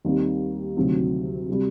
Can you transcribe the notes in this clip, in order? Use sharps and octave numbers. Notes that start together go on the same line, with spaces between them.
D#2 D#3 G3 C4
D2 C3 D#3 F#3 C4
C3 G3